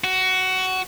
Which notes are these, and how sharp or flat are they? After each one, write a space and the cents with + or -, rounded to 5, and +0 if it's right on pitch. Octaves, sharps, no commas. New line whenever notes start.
F#4 +15